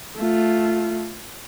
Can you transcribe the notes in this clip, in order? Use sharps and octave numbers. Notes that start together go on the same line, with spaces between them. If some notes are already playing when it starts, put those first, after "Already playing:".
A3 F4